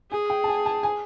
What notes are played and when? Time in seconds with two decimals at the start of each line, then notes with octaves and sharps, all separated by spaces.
0.12 G#4 G#5
0.30 G5
0.44 A5
0.48 G#5
0.66 A5
0.83 G#5